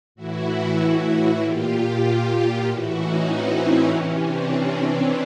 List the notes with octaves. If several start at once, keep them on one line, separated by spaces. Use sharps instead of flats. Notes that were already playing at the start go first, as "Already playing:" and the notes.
A2 E3 E4 F#4
A#2 F4 G4
F4 G4
A2 E3 E4 F#4
C#4 D#4
C4
C3 E3 C#4
C4 D4
C4